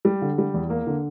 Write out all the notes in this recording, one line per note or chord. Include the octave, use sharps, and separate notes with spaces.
G3
D3
G3
E2
A#3
D3